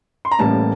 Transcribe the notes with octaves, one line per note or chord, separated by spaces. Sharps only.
C6
A#5
A1 A2 E3 G3 A#3 A5